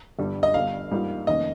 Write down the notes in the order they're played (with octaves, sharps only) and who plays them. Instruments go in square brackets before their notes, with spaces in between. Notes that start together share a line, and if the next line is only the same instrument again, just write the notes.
[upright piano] G1 G2 G3
[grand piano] D#5
[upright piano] G1 G2 G3 [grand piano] F5
[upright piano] G#2 G3 A#3 F4 A#4
[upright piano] F1 D#2 D#3 A#3 C#4 [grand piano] D#5